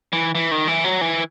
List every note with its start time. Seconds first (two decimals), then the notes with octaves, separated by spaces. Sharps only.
0.13 E3
0.35 E3
0.51 D#3
0.68 E3
0.84 F#3
1.01 E3